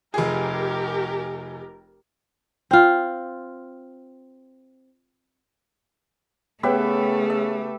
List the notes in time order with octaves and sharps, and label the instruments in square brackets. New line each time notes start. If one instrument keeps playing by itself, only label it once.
[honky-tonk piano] F1 G#4 [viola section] G4 A#4
[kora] C4 F4
[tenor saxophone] C#3 [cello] A3 [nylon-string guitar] B3 C#5 G5 [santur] G4 B4 E5
[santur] E5